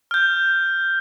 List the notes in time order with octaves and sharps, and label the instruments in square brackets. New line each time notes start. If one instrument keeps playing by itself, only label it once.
[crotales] F6 G6